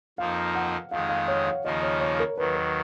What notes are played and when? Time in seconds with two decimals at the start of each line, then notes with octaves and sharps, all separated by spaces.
0.18 F2 F3 A#3 D#4 F5
0.55 F#5
0.91 F2 D#3 G#3 D#4 F5
1.09 F5
1.28 C#5
1.46 F5
1.64 D#2 C#3 F3 A#3 D#4 D#5
1.83 C#5
2.01 C#5
2.20 A#4
2.38 D#2 D#3 F#3 B4
2.56 B4